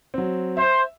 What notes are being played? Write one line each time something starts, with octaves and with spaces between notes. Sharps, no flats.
F#3 C4
C5 E5